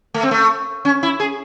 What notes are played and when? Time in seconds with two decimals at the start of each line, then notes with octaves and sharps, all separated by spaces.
0.14 A3
0.23 C4
0.31 A3
0.85 C#4
1.03 E4
1.20 G#4